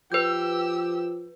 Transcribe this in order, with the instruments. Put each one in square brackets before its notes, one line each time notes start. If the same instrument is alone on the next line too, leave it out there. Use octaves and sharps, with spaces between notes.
[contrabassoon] F3 [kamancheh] G4 E6 [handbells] B4 G6